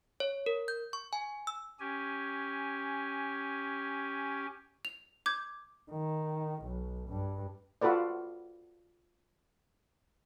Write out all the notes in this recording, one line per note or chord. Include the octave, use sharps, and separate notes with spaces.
C#5
A#4
G6
C#6
G#5
E6
C#4 G4 G#5
F7
D6 G6 G#6
D#3
B1
G2
F4 F#4 A4 B4 D5